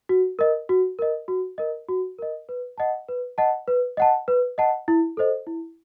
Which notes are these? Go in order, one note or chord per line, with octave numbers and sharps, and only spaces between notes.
F#4
A#4 D#5
F#4
A#4 D#5
F#4
A#4 D#5
F#4
A#4 D#5
B4
D#5 F#5 A5
B4
D#5 F#5 A5
B4
D#5 F#5 A5
B4
D#5 F#5 A5
E4
A4 C5 D#5
E4